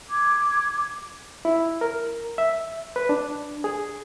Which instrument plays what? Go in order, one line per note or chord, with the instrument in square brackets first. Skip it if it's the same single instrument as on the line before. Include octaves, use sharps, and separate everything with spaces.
[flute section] D6 G#6
[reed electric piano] E4
A#4
E5
B4
D4
G#4